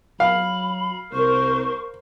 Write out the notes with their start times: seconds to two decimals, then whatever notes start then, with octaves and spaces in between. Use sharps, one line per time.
0.20 F#3 F5 B5
1.13 C2 A#4 C5 C#6